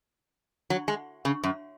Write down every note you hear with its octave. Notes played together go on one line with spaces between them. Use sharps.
F#3
G#3
C#3
F#2